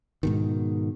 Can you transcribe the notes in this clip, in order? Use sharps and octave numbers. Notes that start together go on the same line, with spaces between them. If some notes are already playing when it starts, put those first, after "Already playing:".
G#2 B2 D#3